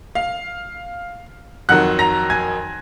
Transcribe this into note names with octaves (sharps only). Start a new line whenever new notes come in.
F5 F6
F2 D#3 F#3 F#5 F#6
A#5 A#6
G#5 G#6